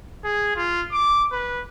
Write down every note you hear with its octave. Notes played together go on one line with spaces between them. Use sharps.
G#4
F4
D6
B4